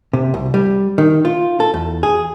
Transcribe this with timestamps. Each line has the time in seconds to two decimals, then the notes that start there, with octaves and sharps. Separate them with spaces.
0.13 C3
0.34 C2
0.54 G3
0.98 D#3
1.25 F4
1.60 A4
1.74 E2
2.03 G#4